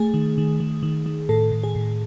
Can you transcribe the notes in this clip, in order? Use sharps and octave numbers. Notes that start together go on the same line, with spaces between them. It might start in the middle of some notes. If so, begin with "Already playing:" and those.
Already playing: A3 G#4
D#3
D#3
D#3
D#3
D#3
A2 A4
A2
G#4
A2